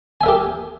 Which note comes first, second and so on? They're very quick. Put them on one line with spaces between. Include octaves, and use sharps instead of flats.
G#5 E5 A#4 G4